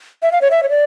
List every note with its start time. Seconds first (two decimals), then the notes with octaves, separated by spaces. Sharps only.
0.22 E5
0.32 F5
0.41 C#5
0.51 E5
0.63 C#5
0.70 D5